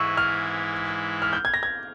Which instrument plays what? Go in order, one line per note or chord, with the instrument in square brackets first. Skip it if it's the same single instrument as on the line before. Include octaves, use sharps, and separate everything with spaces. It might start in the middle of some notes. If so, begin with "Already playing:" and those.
Already playing: [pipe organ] G#2 E3 G#3 E4 [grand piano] C#6 E6
[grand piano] F6
F6
G6
G#6
A#6
G#6